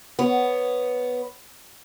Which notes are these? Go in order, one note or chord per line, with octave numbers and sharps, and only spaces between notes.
B3 C#5